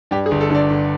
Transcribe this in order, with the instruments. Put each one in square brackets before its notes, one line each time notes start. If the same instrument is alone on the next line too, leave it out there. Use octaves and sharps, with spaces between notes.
[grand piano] G2 G4
G#4
G1
A4
D3 D5
G1